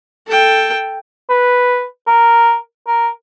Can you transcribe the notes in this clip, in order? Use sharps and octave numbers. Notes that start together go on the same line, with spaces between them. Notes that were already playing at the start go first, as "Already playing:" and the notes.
A4 G5
B4
A#4
A#4